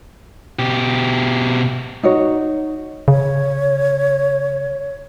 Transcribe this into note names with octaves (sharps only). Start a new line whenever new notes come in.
B2 G4
D#4 F#4 C#5
C#3 C#5